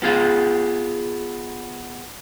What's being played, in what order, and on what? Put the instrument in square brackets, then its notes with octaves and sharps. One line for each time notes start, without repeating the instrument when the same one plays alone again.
[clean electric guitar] B3 F4 G#4 F5